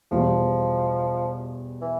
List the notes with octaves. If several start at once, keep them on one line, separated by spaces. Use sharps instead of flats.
E2 B2 F3 G3
E3